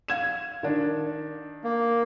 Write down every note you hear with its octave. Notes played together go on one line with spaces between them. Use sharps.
F5 G#6 E7
D#3 D4
A#3